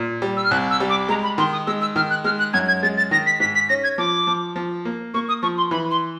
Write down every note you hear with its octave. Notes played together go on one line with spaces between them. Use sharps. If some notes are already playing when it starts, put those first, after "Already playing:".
Already playing: A#2
G3
E6
F6
C2 F#6
E6
G3
D6
G#3 A#5
B5
D#3 C6
D#6
G#3 E6
E6
D#3 F6
F#6
G#3 F6
F#6
F#2 G#6
G#6
G#3 A6
A6
D#3 A#6
B6
G#2 B6
B6
C#4 A#6
G#6
F3 D6
F3
F3
A#3
A#3 C#6
D#6
F3 C#6
C6
E3 B5
C6